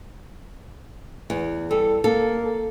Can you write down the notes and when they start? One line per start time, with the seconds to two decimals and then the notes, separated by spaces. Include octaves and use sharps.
1.30 E2
1.71 G3 A4
2.04 A#3 A4